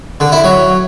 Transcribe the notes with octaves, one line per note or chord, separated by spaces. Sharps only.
D3
E4
F#3